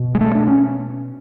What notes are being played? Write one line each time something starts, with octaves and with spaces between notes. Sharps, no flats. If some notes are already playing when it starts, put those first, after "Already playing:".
Already playing: B2
G#3
A3
D4
C#4